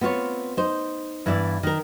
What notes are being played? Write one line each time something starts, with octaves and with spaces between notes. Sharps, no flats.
B3 C4 F4 C5 C#5
D#4 C5
G2 E3 B3 E4 D5
D#3 A#4